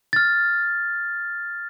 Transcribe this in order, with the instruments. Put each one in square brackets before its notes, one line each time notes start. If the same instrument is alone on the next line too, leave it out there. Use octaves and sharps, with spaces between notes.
[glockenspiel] F6 A6